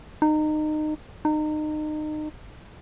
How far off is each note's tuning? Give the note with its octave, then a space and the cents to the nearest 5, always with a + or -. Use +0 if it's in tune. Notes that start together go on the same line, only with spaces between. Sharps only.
D#4 -25
D#4 -30